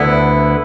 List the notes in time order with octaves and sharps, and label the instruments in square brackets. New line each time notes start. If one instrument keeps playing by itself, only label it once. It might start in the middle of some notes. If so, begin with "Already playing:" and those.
Already playing: [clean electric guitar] D2 D3 B3 E4